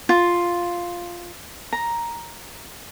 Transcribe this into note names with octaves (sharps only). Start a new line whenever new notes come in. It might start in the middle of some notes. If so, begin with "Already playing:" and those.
F4
A#5